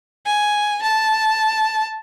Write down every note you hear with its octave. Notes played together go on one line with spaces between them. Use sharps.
G#5
A5